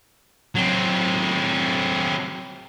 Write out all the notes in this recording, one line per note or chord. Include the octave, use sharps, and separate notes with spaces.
F#3 C4